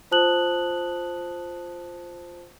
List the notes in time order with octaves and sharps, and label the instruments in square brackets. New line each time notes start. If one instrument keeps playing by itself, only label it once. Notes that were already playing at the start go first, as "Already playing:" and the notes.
[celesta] F4 C5 A5 D#6 F#6 F#7